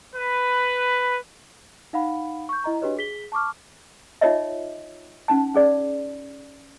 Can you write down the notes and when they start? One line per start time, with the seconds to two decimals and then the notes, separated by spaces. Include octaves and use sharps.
0.14 B4
1.93 D#4 F5 F#5 B5
2.49 C#6 G6
2.64 E4 D#5 A#5
2.81 D4 F#4 G4 B4 C#5 D#5
2.97 G#4 B6 G7
3.32 A5 C#6 D6 F6
4.21 D#4 F4 C#5 D#5 E5
5.28 C#4 D#4 A5
5.54 C#4 G#4 D5